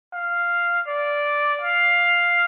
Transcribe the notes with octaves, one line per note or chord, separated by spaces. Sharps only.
F5
D5
F5